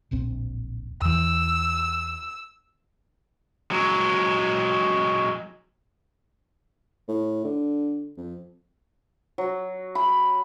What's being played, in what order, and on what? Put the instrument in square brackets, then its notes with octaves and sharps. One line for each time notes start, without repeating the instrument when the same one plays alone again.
[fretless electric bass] D1 A#1 C4
[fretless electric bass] E2 E3 [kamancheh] E6
[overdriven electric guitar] F#3 G#3
[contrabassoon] A2
D3
F2
[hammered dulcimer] F#3
B5